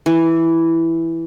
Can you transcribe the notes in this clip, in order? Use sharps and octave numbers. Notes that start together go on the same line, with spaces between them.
E3